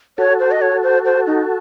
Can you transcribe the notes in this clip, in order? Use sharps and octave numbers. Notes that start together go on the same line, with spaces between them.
F#4 A4 C#5
C5
D#5
C#5
C5
C5
D#4